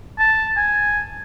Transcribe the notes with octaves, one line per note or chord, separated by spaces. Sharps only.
A5
G#5